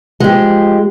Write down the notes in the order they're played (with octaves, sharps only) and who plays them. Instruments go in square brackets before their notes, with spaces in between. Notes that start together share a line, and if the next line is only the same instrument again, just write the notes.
[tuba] F3 [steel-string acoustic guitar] G#3 G4